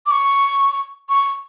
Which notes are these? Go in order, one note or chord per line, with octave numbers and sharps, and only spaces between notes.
D6
C#6
C#6